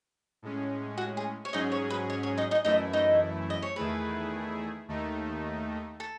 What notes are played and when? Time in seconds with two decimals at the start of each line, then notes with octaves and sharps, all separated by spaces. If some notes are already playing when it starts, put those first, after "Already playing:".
0.42 A2 G#3 C#4
0.98 F#4
1.17 G#4
1.45 C#5
1.53 G#2 F#3 C#4 D#4 G#4 D#5
1.72 C#5
1.90 B4
2.10 C#5
2.23 C#5
2.38 D#4 D#5
2.51 D#4 D#5
2.65 F#2 E3 A3 D#4 E4 D#5
2.93 D#4 D#5
3.50 D#5
3.62 C#5
3.76 E2 D#3 A3 E4 G#4 B4
4.88 D#2 D#3 A3 D#4
6.00 A4